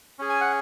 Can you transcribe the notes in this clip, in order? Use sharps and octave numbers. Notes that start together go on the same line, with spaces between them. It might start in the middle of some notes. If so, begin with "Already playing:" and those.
C#4 G#4
G#5
F#5